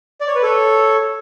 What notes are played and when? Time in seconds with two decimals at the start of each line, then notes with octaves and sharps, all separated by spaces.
0.21 D5
0.28 C#5
0.35 B4
0.43 A4 C#5